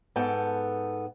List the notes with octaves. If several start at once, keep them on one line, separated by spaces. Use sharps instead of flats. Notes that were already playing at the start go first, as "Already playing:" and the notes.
G#2 B3 A4 G5